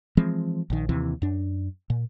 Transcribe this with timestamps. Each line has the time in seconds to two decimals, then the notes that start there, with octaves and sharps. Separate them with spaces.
0.17 E3 F3 G#3 C4
0.70 A#1 D#3
0.89 D#2 C3 E3
1.22 F#2 D4
1.90 A#2